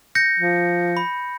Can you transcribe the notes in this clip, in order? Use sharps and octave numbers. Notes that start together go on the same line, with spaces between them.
G6 A#6 C#7
F3
B5